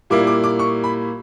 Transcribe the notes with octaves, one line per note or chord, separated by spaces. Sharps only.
A#2 G3 A#3 E4 D6
D6
D6
C#6
B5